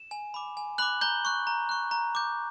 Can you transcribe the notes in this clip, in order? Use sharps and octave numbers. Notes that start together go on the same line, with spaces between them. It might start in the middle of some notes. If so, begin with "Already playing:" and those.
Already playing: E7
G#5
B5 D6
G#5
B5 D6 F#6 F#7
A#5 G6 G7
C#6 F#6
A#5
C#6 F#6
A#5
D6 G6